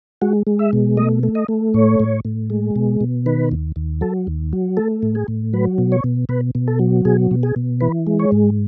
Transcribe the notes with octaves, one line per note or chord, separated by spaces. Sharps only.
G#3 F#4
G#3
E5
B2
A3 D#5
A3
D#5
A3
A2 C#5
A2
A2
G#3
B2
B2
D#3 B4
D#2
D#2
F#3 A4
D#2
F#3
A3 A4
A2
G#4
A2
F#3 B4
B2
C#5
B2
B2 B4
B2
A4
F#3
B2 G#4
B2
G#4
B2
E3 B4
G#3
C#5
G#2